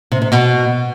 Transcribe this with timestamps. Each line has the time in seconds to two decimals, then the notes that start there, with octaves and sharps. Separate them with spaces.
0.12 C3
0.22 C3
0.32 B2